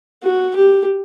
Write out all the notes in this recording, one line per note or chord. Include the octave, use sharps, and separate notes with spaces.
F#4
G4